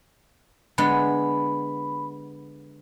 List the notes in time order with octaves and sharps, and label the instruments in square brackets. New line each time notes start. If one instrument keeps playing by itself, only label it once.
[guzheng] D3 G#3 B3 [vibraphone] B5